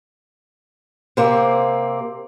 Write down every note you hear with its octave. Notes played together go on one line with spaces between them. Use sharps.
C3 A#3 C4